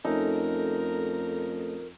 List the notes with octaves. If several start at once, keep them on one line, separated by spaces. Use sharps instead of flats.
F2 A3 C#4 D#4 A4 A#4